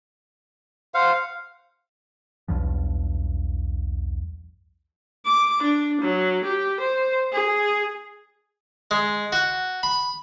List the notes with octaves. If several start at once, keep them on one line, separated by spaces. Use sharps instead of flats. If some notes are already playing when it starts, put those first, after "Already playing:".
C5 F5 F#5
B1 E2 G2 F3
D6
D4
F#3
G4
C5
G#4
G#3
F#4
B5